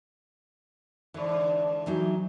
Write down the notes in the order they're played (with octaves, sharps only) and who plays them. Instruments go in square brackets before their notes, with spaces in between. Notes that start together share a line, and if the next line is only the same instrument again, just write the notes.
[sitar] G#2 D3 [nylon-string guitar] E3
[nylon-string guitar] E3 F#3 D#4